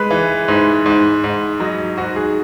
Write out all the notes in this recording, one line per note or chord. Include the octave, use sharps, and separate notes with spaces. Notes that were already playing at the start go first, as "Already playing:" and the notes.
Already playing: G#3 B4
E3
G#2
G#2
G#2
F#3 D#4
G#2 F#4
G#4